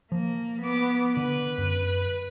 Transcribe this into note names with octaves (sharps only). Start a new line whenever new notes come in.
F3 A#3
B3 D6
D3 B4
F#2